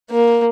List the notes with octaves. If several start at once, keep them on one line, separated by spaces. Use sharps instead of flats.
A#3